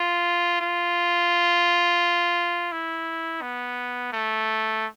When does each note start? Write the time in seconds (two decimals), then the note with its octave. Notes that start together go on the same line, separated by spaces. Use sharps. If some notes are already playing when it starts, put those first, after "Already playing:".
Already playing: F4
0.61 F4
2.72 E4
3.42 B3
4.12 A3